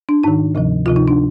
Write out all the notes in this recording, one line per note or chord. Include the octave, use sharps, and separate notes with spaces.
D4
G#2 D#3 D#4
D2 C3 F3
D2 C3 F3 F4
D#4
D4